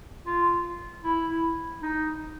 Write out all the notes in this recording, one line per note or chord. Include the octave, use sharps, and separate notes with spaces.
F4
E4
D#4